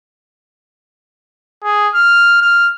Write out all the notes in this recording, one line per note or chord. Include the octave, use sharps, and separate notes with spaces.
G#4
F6
F6